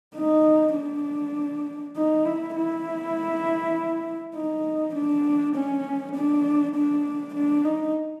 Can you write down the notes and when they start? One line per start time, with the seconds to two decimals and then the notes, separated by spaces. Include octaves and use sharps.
0.16 D#4
0.76 D4
1.96 D#4
2.25 E4
2.56 E4
4.36 D#4
4.95 D4
5.55 C#4
6.15 D4
6.75 D4
7.35 D4
7.65 D#4